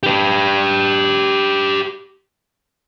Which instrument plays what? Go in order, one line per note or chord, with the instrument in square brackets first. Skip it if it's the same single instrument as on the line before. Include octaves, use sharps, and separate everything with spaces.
[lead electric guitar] G4 B4